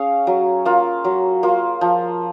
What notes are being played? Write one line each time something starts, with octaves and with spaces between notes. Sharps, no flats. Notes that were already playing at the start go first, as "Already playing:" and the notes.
Already playing: C#4 G#4 C#5 F5
F#3
A#3 F4
F#3
A#3 F4
F3